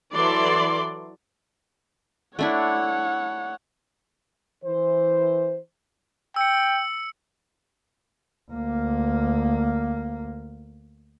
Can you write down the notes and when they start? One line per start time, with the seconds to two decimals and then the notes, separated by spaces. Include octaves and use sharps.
0.14 E3 F#3 A4 D5 C6
2.39 A3 D4 E4 C#5 F#5
4.63 E3 C5
6.36 G5 E6 C#7
8.51 D2 A#3